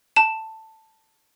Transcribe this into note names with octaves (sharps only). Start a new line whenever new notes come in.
A5 E7